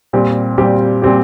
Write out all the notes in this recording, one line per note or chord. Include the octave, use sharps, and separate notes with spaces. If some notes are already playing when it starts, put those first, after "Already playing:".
A#2 G3 C4 G4
A#2 G3 C4 G4
A#2 G3 C4 G4